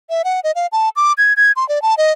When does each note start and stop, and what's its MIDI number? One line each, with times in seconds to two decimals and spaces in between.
0.10 0.22 76
0.24 0.40 78
0.44 0.52 75
0.55 0.67 77
0.72 0.89 81
0.96 1.13 86
1.18 1.33 92
1.37 1.52 92
1.56 1.67 84
1.69 1.82 74
1.82 1.95 81
1.98 2.12 75